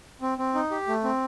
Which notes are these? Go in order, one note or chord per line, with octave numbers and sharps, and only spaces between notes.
C4
C4
D#4
G4
A3
C4